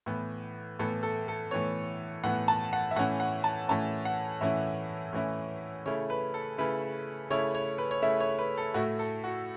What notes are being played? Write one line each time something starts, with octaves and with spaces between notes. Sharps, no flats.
A2 E3 B3
A2 E3 B3 A4
A4
A4
A2 E3 B3 C#5
A2 E3 B3 F#5
A5
F#5
E5
A2 E3 C#4 E4 F#5
F#5
A5
A2 E3 C#4 E4 A5
F#5
A2 E3 C#4 E4 E5
A2 E3 C#4 E4
C#3 A3 E4 C#5
B4
A4
C#3 A3 E4 B4
C#3 A3 E4 C#5
C#5
B4
C#5
C#3 A3 E4 E5
C#5
B4
A4
A2 A3 E4 F#4
A4
F#4